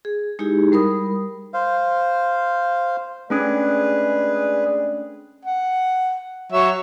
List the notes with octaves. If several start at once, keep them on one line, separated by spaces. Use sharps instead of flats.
G#4
G#3 D#4 E4 G4 G#4
G3 A#4 B5 D#6
C5 F5
G#3 A3 C#4 D4 G#4 B4 D5
F#5
F#3 C#5 E5